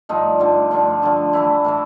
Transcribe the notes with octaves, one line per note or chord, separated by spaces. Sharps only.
G2 D3 F3 A3 D#4
G2 D3 F3 A3
G2 D3 F3 A3 D4
G2 D3 F3 A3
A2 E3 A3 E4
A2 E3 A3